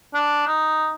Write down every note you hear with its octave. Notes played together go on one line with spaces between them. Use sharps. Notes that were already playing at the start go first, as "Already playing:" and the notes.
D4
D#4